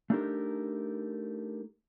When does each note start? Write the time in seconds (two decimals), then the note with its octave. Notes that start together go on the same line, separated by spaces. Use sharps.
0.10 A3 D4 D#4 G4 A4 A#4